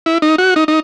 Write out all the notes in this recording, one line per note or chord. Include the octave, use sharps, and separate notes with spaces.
E4
D#4
F#4
D#4
D#4